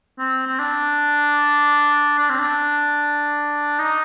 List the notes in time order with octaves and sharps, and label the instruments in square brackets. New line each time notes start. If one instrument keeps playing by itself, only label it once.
[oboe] C4
C4
D4
D4
C4
D4
D#4